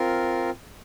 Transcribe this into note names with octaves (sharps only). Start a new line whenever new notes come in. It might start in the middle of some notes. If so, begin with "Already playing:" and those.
Already playing: C4 F4 A#4